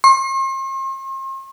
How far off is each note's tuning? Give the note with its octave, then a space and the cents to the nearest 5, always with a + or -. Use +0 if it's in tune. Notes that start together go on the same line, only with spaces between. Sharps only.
C6 +45